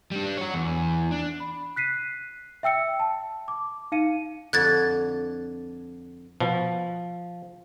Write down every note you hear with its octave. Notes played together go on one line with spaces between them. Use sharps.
G3 D4
F#4 C#5
E2
D4
B5
F#6 B6 C7 D#7
E5 G5 E6 C#7
A5
D6
D#4 F5 C#7 D#7
F2 D3 F#6 G#6 A6
B2 F3